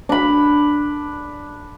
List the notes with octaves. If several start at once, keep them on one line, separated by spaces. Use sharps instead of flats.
D4 B5